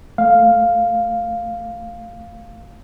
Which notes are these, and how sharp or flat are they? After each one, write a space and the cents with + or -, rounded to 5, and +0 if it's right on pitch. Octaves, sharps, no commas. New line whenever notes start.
A3 +0 F5 +0